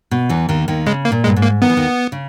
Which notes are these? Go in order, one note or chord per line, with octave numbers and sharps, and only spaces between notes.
B2
E2 E3
D#2 D#3
D#2 D#3
C#3 G#3
A#3
A#2
G2 G#3
G#2
A#3
D#3 B3
E3
D#2 D#3
C#3